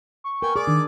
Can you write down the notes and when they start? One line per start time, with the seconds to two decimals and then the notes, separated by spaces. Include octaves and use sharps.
0.24 C#6
0.42 B3 A#4 G5 G#5
0.56 G#4 D5 D6
0.67 D#3 D4